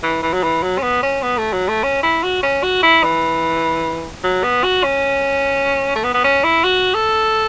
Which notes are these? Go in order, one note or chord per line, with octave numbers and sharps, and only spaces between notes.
E3
E3
F#3
E3
F#3
C#4
B3
C#4
B3
A3
F#3
A3
C#4
E4
F#4
C#4
F#4
E4
E3
F#3
B3
F#4
C#4
A3
B3
B3
C#4
E4
F#4
A4